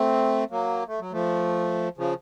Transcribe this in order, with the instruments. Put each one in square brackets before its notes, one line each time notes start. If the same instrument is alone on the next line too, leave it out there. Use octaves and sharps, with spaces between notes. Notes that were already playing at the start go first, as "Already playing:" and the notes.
Already playing: [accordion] A3 C4
F#3 A#3
A3
F#3
F3 A3
C#3 F3